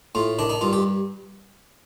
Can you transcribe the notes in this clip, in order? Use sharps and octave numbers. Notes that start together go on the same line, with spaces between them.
A2 F4
D#3 D4
D#4
G2 F4
G4